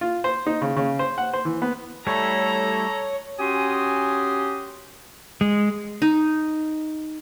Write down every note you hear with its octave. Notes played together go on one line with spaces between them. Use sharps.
F4
C5
D#4
C#3
C#3
C5
F#5
C5
E3
B3
G3 A3 E4 A4 C#5 A#5
C#4 F#4 G4 G#5 C6 D#6
G#3
D#4